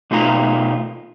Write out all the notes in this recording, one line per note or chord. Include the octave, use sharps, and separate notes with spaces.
B2 A3 D#4 F4 G#5 A#5